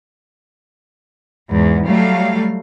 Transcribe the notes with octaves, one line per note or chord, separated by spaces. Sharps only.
E2 G#2
F#3 G3 A3 F5